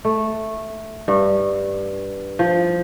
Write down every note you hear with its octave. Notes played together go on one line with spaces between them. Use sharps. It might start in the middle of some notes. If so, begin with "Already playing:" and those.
A3
G2
F3